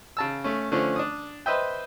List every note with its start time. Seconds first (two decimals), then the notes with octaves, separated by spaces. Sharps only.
0.17 C#3 A5 E6
0.44 A3 C#4
0.72 D3 F3 A3 C#4
0.96 D4 D#6
1.46 B4 C5 D#5 E5 G5